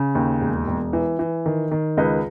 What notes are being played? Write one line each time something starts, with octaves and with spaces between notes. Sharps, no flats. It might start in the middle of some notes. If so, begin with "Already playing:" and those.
Already playing: C#3
D#2
E1
E1
E3
E3
D#3
D#3
C#2 B4 D#5